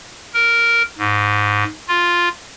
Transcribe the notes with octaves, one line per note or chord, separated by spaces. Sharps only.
A#4
G#2
F4